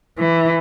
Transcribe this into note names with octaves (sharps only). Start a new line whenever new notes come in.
E3